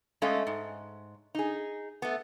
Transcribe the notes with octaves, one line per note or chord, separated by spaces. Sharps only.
G#3 A3 C#4 D#5 F5
G#2
D#4 G#4
A3 B3